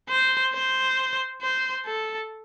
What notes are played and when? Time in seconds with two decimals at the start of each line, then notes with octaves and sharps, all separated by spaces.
0.09 C5
0.54 C5
1.42 C5
1.86 A4